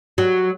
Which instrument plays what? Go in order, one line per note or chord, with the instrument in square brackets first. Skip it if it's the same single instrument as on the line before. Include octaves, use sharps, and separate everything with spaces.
[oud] F#3